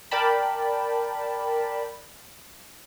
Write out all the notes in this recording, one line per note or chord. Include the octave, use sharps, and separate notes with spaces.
A#4 D5 G5 A5 B5